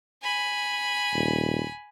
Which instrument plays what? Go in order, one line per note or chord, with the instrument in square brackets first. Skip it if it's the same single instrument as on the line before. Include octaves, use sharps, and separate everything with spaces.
[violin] G#5 B5
[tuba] D#1